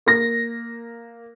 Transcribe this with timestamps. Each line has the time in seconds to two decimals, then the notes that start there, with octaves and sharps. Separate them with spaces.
0.06 A#3 A#6